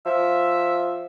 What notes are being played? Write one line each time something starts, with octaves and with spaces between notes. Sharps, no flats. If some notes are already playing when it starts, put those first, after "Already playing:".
F3 E5